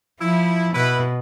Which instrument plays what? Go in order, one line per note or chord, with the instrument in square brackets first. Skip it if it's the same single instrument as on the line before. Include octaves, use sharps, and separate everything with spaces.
[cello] F3 [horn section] E4
[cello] B2 [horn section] E4 B4